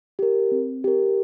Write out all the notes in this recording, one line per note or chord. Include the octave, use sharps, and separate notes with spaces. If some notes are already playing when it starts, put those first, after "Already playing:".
G4 A#4
C4
G4 A#4